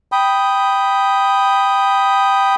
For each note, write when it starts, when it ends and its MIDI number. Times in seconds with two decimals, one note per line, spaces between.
0.12 2.55 79
0.12 2.55 83
0.12 2.55 87